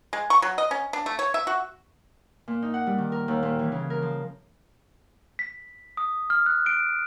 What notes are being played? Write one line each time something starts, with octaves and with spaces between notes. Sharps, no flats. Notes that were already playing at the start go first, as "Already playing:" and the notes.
G#3
C#6
F#3
D#5
C#4
D4
A3
C#5
E5
F#4
A#2
D#4
F#5
G3
D#3
A#4
D#2
A#2
E3
C#3
A#4
F3
B6
D#6
F6
F#6
D7